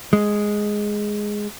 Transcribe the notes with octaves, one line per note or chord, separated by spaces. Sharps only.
G#3